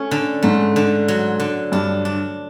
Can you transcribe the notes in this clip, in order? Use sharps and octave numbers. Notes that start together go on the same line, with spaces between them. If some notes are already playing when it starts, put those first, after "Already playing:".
Already playing: A3 C#4
D3
G#2 A3
D3
F#3
D3
G2 D4
D4